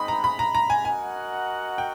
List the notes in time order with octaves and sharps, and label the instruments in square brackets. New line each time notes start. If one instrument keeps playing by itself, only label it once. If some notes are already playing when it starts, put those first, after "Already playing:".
Already playing: [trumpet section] G#3 C4 D#4 [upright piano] B5
[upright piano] A#5
B5
A#5
A#5
G#5
[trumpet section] F#4 A#4 D#5 F#5 [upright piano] G#5
[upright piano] G5